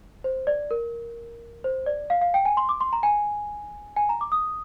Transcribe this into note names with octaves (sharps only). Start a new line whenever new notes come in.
C5
D5
A#4
C5
D5
F5
F5
G5
G#5
C6
D6
C6
A#5
G#5
G#5
A#5
D6
D#6